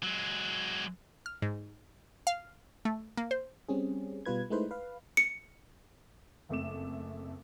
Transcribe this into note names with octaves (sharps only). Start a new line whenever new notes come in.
F#3 G#3
F6
G#2
F5
A3
A#3
C5
G3 C4 C#4 G#4
B2 G3 F4 B4 G#6
G#3 A3 D#4 E4 B4 C5
B4 F5
C#7
F#1 F2 A3 D6 E7